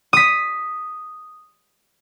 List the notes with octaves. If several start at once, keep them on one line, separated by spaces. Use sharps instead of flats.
D#6 B6